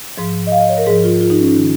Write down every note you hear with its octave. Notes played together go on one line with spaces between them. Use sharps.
G#2 F3
D#5
F5
D#5
C#5
A#4
G#2 F3 G#4
F4
F4
D#4
C#4
D#4
D#3